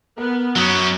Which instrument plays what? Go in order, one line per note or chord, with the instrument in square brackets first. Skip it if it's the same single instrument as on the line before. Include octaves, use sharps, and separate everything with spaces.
[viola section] B3 [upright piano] A#4
[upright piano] F#2 D#6 F#6 [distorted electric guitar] F#3 C#4